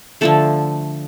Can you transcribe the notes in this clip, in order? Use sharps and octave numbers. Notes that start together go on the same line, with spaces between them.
D3 F3 A3 A4